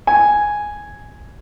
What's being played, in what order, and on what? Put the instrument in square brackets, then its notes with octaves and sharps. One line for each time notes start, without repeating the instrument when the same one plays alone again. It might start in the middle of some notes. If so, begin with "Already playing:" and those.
[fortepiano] G#5